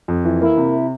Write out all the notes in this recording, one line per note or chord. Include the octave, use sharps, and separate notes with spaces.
F2
E3
A#3 E4
C3